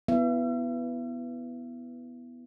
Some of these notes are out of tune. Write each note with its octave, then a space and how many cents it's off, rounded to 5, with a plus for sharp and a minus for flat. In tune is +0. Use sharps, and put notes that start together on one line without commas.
B3 +0 E4 +0 E5 +40